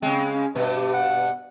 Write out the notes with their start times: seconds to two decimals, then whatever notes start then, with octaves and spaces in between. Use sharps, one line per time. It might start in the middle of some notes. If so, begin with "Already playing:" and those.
0.02 C#3 G#3 C4
0.34 C#4
0.55 G2 B2 B4
0.76 G4
0.94 F#5